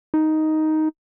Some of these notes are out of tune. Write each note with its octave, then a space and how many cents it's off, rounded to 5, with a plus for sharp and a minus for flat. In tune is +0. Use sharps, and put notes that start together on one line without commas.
D#4 +5